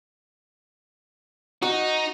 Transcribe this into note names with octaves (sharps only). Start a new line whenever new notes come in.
D#4 F#4